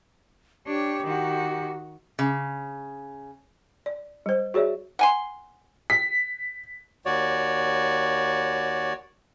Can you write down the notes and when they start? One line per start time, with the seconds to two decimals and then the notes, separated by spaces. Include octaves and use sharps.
0.66 D4 G4 C#5
1.05 D#3 F#4
2.19 C#3
3.86 D5
4.26 G3 C5
4.54 F#4 G#4 C#5 D5 E5
4.99 F#5 G#5 C6
5.90 B6
7.06 D#2 F#4 C#5 D5